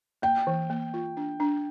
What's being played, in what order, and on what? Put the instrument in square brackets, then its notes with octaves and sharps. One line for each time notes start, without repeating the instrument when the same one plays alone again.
[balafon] A#3 [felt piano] G5
[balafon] E3
A#3
F4
D4
D4